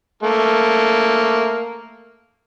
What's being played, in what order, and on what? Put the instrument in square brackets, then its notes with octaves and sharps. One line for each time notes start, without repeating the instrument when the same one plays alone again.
[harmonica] A3 A#3